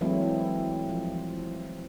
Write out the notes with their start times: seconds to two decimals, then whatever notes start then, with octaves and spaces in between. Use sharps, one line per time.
0.01 E3 F#3 G#3 A3 C4 E4
0.89 F3